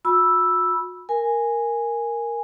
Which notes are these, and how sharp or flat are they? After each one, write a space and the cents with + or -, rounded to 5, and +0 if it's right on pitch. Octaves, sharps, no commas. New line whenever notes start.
F#4 -45 B5 -15 E6 +0
A#4 +0 G#5 -5